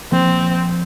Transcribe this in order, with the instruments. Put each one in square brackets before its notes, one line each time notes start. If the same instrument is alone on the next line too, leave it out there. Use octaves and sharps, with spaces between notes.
[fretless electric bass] F3 A#3 [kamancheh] C4